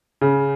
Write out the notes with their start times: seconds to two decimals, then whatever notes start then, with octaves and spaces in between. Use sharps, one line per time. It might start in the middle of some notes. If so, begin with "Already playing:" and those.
0.21 C#3